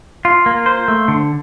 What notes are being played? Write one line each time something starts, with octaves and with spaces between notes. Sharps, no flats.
F4
A#3
C5
A3
D3